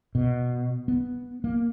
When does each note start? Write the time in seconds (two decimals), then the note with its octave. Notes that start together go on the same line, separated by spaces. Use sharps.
0.15 B2
0.88 B3
1.44 A#3